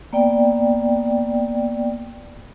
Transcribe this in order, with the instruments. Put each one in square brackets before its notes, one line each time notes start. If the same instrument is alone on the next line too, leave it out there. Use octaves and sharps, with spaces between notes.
[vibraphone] A#3 B3 D5 G5